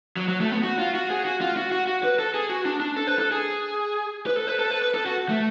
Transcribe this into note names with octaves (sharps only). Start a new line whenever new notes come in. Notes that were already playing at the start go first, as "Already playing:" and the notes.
F#3
F#3
A3
B3
F#4
F4
F#4
G#4
F#4
F4
F#4
F#4
F#4
B4
A4
G#4
F#4
D4
D4
A4
B4
A4
G#4
B4
A4
B4
A4
B4
B4
A4
F#4
A3